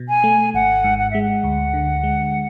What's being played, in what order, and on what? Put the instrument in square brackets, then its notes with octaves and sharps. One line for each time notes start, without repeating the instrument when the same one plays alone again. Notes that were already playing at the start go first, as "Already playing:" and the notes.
Already playing: [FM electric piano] B2
[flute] G#5
[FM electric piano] A3
[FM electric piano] G#1 [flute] F#5
[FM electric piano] G#2
[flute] F#5
[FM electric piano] G#3 [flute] E5
[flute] F#5
[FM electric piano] D2
D3
G#3